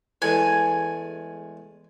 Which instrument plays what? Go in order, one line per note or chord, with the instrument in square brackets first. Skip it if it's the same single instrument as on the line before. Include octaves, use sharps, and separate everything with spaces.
[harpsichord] E2 G#3 A3 [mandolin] G#5